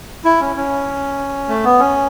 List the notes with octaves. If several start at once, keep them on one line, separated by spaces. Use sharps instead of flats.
E4
C#4
C#4
A3
B3
C#4